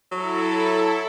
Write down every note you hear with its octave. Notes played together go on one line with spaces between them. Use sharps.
F#3 E4 A4